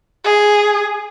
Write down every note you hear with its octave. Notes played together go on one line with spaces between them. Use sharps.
G#4